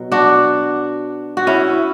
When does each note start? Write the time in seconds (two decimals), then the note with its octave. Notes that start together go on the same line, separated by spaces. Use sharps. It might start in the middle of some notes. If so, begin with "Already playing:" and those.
Already playing: B2 F#3
0.12 D4 F#4
1.37 F#4
1.47 C#4 E4